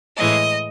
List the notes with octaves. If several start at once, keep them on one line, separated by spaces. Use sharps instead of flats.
A2 E3 G#3 D#5